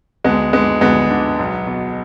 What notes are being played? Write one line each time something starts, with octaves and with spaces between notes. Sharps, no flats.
D2 G#3 B3
D3 G#3 B3
D2 G#3 B3
D3
B1
B2